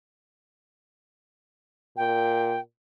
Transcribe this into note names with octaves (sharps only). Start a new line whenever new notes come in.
A#2 G5